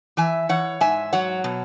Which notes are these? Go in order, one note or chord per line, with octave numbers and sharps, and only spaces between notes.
E3 E5 G#5
E3 C#5 F#5
G#2 E5 G#5
F#3 C#5 F#5
B2